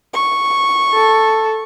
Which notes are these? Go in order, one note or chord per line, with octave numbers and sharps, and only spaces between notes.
C#6
A4